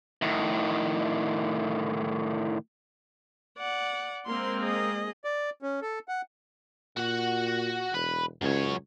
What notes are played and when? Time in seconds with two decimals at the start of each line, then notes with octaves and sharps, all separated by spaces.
0.22 A2 D#3
3.58 D5 F#5
4.26 G#3 A#3 C4 C6
4.59 G#4 D#5
5.24 D5
5.62 C#4
5.82 A4
6.08 F#5
6.97 A#2 F#4 F#5
7.94 E1 B4
8.42 C#2 F#2 C#5